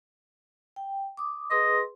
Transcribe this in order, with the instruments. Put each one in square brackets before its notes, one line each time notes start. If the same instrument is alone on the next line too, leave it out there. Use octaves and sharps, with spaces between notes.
[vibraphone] G5
D6 D#6
[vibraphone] G#4 B4 C6 [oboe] D#5